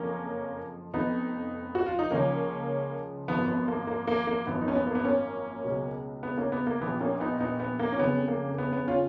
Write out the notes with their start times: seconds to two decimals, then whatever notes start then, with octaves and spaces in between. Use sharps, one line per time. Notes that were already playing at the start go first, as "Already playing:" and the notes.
Already playing: F#1 F2 F3 A#3 C#4
0.93 F1 F2 F3 B3 D#4
1.75 F#4
1.86 F4
1.99 D#4
2.11 C#2 C#3 F3 A#3 C#4
3.28 G#1 F#2 F3 B3
3.48 B3
3.68 A#3
3.87 A#3
4.07 A#3
4.27 A#3
4.46 G#1 F#2 F3 B3
4.61 D#4
4.68 C#4
4.75 B3
4.87 A#3
4.95 B3
5.05 A#3 C#4
5.64 C#2 B2 F#3
6.23 B3
6.37 A#3 C#4
6.52 B3
6.67 A#3
6.81 A#1 A#2 F3 B3
7.01 A#3 C#4
7.20 B3 D#4
7.40 B3 D#4
7.60 B3
7.79 A#3
7.92 C#4
7.99 F2 C#3 F#3 B3
8.28 A#3
8.58 B3
8.73 B3
8.88 C#4 F4